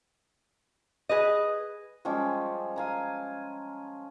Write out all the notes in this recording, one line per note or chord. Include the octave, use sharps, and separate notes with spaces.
G#4 B4 D#5
F3 G3 G#3 C#4
F5 G#5 A#5